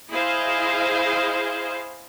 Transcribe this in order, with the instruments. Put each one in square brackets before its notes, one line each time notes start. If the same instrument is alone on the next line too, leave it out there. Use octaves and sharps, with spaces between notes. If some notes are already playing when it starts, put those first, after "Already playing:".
[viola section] E4 G#4 C5 D#5 F5